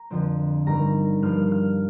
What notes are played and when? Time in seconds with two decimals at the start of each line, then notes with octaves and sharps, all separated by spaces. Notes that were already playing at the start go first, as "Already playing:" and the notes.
Already playing: A#5
0.10 F2 D3 F3 C4
0.67 G2 D#3 G3 A#5
1.22 G2 F3 A#3 F6
1.52 F6